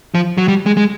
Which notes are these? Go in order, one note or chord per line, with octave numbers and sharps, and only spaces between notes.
F3
F#3
G3
G#3
G#3